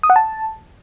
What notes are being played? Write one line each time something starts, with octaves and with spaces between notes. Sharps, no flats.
D#6
F#5
A5